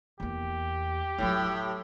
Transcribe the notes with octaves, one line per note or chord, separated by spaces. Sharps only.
E2 A#3 G4
A2 F#3 A3